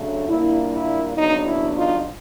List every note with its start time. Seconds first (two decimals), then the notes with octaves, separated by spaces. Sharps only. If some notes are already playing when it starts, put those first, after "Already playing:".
Already playing: C#3 F#3 A3 D4
0.28 A#2 G3 A#3 D4 E4
0.72 E4
1.17 D#2 C#3 F#3 B3 D4 D#4
1.46 E4
1.75 D#4 F4